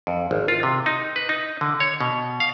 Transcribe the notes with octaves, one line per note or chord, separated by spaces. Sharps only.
F2
G#1
F4
C3
D#4
B4
D#4
D3
C#5
B2
F5